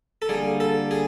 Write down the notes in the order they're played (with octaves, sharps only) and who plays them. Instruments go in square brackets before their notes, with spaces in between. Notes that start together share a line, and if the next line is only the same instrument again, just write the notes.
[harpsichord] A4
[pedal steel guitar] D3 G3 A#3 [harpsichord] G#4
[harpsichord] A4
G#4